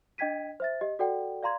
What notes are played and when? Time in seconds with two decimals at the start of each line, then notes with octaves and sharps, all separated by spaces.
0.18 D4 D#5 G5 G#6 B6 D#7
0.60 C5 E5 A6
0.81 G4 D#5
0.99 F#4 A4 D5 F#5 G5
1.43 D5 F5 A#5 C6 G#6